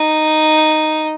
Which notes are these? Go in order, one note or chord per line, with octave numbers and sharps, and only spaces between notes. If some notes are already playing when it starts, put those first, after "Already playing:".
Already playing: D#4